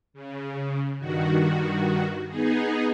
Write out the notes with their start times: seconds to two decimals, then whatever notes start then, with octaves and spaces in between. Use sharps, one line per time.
0.13 C#3
0.99 G2 D#3 F#4
2.28 B3 D#4 G#4